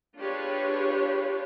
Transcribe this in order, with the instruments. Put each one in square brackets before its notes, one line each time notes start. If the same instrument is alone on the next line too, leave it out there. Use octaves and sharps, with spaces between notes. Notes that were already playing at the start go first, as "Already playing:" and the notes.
[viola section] D4 F4 G4 G#4 B4 C#5